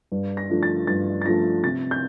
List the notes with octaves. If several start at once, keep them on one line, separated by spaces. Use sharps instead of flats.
G2
A#6
F3 A3 D4 F4
A6
G2 A6
A6
F3 A3 D4 F4 A#6
C3 A6
G6